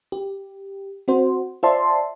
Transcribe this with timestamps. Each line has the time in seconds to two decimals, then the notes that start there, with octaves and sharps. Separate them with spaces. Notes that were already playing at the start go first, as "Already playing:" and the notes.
0.12 G4
1.08 C4 F#4 C5
1.63 F4 C5 D5 E5 A5 C6